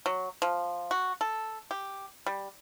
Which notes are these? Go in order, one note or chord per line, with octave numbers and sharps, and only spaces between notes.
F#3
F3
F#4
A4
G4
G3